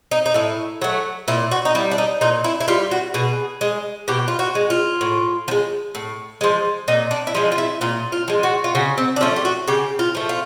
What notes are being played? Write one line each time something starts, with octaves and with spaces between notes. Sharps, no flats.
D#4
D#4
A2 E4
F#3 A3
A#2 E4
F#4
D#4
G3 E4
D4
D#4
A#2 D#4
E4
E4
G3 F4
F#4
B2 G#4
G#3
B2 G4
F4
F#4
G#3
F4
A2
F3
G#3
A2
F3 G#3
A#2 D#4
D4
E4
F3 G#3 D#4
F4
E4
A#2 F4
F4
F3 G#3
F#4
F4
C#3 F#4
C4
D4
F3 A3 C#4
G4
F#4
C#3 G4
F4
F3 A3
F4